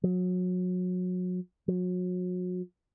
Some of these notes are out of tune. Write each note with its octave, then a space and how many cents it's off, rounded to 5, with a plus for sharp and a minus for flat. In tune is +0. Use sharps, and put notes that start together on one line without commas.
F#3 -30
F#3 -35